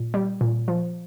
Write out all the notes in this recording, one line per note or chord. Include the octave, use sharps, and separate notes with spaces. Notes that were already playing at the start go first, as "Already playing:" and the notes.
Already playing: A#2
G3
A#2
F3